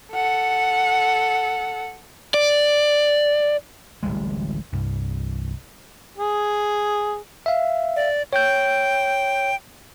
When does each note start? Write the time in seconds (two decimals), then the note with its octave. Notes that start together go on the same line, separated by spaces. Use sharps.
0.13 A4 F#5
2.34 D5
4.03 D1 A1 G3 G#3
4.72 C2 G2
6.18 G#4
7.46 E5 F5
7.96 D5
8.33 C#5 G5 G6